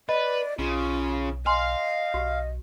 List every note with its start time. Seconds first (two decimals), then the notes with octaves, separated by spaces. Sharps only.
0.09 B4 D5 D#5
0.59 B1 C#3 F4
1.46 D#5 F5 G#5 C6
2.14 B1 F#4 G4